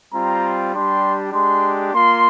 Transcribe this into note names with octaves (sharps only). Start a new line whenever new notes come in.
G3 C4 F4 A#5
G3 D4 G4 C6
G#3 D4 G4 C6
A#3 F4 C6